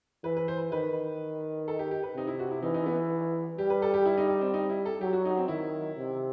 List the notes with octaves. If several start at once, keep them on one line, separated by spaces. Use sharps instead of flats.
E3 B4
B4
C5
D#3 B4
A4
G4
G4
B4
C3 D#4
E4
F#4
E4
E3 D#4
D#4
B3
G3 G4
B4
A4
G4
E4
D#4
D#4
C4
D#4
E4
A4
F#3 G4
F#4
D#4
C4
D#3 E4
C3